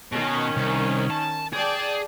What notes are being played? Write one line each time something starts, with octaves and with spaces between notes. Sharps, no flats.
B2 D#3 C#4
C2
A5
G#4 D5 G5 A5